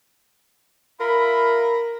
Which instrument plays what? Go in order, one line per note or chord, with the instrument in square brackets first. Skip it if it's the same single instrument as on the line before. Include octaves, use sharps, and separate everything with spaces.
[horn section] F4 E5 B5 [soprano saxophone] A#4